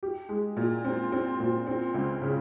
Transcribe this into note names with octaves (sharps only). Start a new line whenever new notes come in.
G4
G#3
A#2
C4
C4
A#2
C4
C#2
C#3